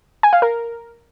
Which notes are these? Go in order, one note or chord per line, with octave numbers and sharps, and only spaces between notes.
G#5
F5
A#4